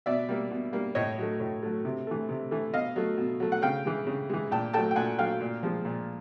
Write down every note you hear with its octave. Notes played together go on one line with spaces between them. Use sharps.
B2 D5 E5
G3 A#3
B2
G3 A#3
A2 C#5 D#5
F#3 A3
A2
F#3 A3
C3
E3 A3
C3
E3 A3
B2 D#5 F5
F#3 A3
B2
F#3 A3
F#5
C#3 F5 G5
E3 G#3
C#3
E3 G#3
A#2 G5 A5
F#3 A3 G5 A5
G5
A#2 F#5 G#5
F#3 A3 F5 G5
A#2
F3 G#3
A#2